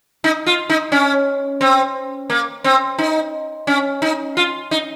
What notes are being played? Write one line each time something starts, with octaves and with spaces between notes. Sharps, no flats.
D#4
F4
D#4
C#4
C4
A#3
C4
D#4
C#4
D#4
F4
D#4